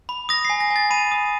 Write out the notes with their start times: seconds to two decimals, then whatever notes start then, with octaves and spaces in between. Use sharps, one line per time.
0.09 B5
0.29 D#6 A#6
0.45 G#5 C7
0.60 A#6
0.71 G#5
0.76 A6
0.90 B5 D#7
1.12 D#6